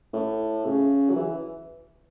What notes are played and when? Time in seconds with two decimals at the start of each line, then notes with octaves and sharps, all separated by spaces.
0.13 A2
0.65 C#3
1.09 F#3
1.16 E3